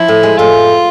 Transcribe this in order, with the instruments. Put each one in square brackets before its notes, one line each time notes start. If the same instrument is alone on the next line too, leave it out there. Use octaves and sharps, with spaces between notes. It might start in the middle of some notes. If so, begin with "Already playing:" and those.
Already playing: [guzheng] F3 [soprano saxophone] E4
[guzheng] A2
G#3
[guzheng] A2 [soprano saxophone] F4